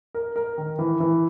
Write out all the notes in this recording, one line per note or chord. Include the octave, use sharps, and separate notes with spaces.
A#4
A#4
D#3
E3
E3